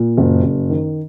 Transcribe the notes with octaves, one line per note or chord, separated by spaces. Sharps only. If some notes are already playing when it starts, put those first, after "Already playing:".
Already playing: A#2
F#1
F#1
D#3